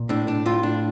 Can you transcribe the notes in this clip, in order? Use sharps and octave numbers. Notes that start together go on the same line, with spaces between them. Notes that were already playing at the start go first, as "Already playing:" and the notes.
Already playing: A#2
A2 D4
D4
A2 F4
D4